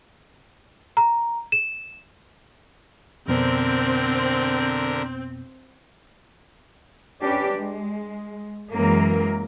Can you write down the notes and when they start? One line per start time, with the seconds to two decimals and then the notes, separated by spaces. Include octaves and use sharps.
0.97 A#5
1.52 E7
3.28 F2 B2 D3 B3 C4 A#4
7.22 C#4 D4 G4 B4
7.56 G#3
8.73 F#2 E3 F#3 G#3 A#3 A#4